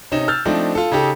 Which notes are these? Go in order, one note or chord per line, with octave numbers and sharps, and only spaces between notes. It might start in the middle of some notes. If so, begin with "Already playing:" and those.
C3 C#4 D#4 E7
E6 F6 G6 A6
F3 A3 C4 D4 D#4
F4 A4
C#3 D#4 G4 A4